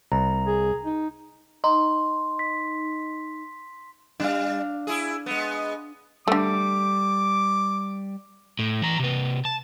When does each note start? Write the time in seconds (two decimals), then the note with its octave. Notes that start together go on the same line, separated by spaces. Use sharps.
0.12 C2 A#5
0.47 G#4
0.85 D#4
1.64 D#4 C6
2.39 B6
4.20 G3 D4 F5
4.87 E4 G#4
5.26 G#3 B3
6.28 D3 G3 A3 D6
8.59 A2
8.82 E3 A#5
8.99 C3 B4
9.45 A5